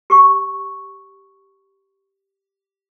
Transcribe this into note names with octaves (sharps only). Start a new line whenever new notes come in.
G4 C#6